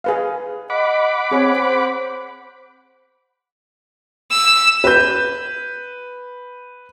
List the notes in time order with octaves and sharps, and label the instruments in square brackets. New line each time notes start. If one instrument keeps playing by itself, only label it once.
[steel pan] G#4 B4 F5
[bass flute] D#5 [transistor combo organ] F#5 B5 D6
[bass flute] C4 [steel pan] G#4 C#5
[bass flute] C5
[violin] E6
[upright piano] B4 G6